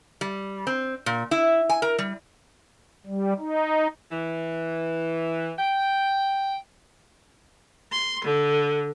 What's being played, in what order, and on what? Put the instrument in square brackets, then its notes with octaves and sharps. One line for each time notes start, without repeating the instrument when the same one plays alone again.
[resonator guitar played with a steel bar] G3
C4
A#2
E4
G#5
A#4
G3
[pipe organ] G3
D#4
[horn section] E3
G5
[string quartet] C6
D3